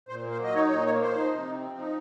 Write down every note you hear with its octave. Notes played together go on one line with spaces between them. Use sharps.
A#2 C5
A#3
C5
F#3 D#5
D#4 C#5
A#2 C#5
A#3 C#5
F3 C5
D#4
C3
C4
F3
D#4